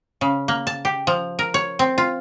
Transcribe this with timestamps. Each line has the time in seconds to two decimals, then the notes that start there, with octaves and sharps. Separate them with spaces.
0.21 C#3
0.48 A#3
0.67 A5
0.85 G4
1.07 F3
1.39 A#4
1.54 C#5
1.79 C4
1.98 F4